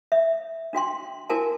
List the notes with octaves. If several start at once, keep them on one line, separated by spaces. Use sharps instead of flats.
E5
D4 F#4 G5 C6
E4 F#4 A#4 G#5 A5